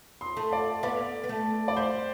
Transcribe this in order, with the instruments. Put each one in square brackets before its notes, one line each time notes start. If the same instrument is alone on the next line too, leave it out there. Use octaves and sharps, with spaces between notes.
[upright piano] C6
[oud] A3
[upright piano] D5
[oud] B3 [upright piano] D5
[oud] B3
A3
[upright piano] D5
[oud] G3 [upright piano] C5